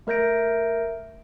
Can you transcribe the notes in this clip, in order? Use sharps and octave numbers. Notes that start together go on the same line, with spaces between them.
A3 A#4 E5 G6 A#6 D7